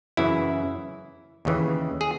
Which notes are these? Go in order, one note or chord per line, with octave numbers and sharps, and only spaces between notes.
F#2 C#3 E3 E4
D#2 C#3 E3
G#4